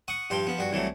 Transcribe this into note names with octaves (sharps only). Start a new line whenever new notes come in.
F#5 C#6 D#6
G2 F3 G4 C6
F3 B3
G2 F#4
C2 E3 F#3 A3